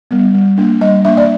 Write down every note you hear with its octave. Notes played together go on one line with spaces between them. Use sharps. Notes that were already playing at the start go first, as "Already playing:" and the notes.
G3 B3
G3
A#3 D4
G3 D#5
A#3 D4 E5
D5